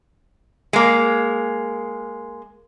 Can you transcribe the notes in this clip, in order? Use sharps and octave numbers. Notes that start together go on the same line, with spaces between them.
G#3 A#3